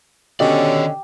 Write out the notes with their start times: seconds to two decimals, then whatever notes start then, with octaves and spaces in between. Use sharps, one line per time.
0.40 B2 D3 D#3 C#4 G4 D5 D#5